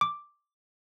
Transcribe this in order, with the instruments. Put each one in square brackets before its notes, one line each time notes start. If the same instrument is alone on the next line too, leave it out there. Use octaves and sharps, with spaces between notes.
[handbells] D6